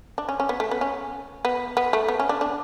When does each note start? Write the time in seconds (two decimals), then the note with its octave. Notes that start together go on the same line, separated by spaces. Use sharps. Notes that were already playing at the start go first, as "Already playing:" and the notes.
0.18 D4
0.29 C#4
0.40 C#4
0.49 B3
0.60 A3
0.71 B3
0.81 C#4
1.45 B3
1.77 B3
1.93 A3
2.08 B3
2.20 C#4
2.29 D4
2.41 D4